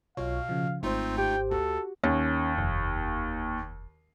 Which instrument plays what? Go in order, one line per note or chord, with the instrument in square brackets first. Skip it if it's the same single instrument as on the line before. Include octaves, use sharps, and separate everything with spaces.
[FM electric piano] B1 F4 C#5 [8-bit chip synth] B2 [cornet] F5
[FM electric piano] C#3 F3
[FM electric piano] G#1 G#2 C5 [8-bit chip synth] A3 D#4 F4 [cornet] C4
[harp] G4 [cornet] G5
[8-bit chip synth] D2 [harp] F#4 [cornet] A4
[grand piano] D#2 [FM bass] C#4
[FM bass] F1